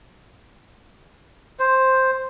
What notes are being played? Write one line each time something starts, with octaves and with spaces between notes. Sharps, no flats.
C5